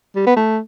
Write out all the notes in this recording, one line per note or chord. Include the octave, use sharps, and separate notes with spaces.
G3
B3
A3